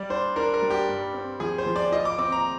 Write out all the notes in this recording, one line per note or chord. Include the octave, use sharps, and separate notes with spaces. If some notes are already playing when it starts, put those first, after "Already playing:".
Already playing: G3 D5
D4 C5
D4 A#4
A#4
G3
G4
G2
C4
F3 G#4
C5
F3
D5
F4 D#5
D6
C4 D6
A#5